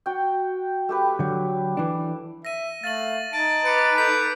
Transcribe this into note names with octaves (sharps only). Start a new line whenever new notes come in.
F#4 G5
A3 G4 B4
D3 F#3
E3 D4
E5 A#6 D#7
A3 F5 A6 D#7 F#7
D#4 A5 D7
B4 D6 C#7 D7
A4 G6 B6 D7